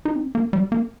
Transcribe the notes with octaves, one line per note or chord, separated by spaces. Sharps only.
D#4
C4
A#3
G3
A#3